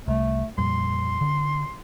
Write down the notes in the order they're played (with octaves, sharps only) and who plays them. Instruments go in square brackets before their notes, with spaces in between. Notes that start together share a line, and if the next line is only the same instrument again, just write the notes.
[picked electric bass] C2 [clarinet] A3
[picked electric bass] F2 A#2 G3 [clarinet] C6
[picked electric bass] D3